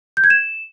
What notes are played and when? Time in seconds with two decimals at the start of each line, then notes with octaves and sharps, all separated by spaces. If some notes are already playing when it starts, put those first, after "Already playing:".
0.17 G6
0.24 G#6
0.30 E7